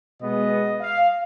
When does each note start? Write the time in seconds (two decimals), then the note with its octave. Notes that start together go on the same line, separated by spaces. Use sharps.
0.20 B2 G#3 B3 D#5
0.81 F5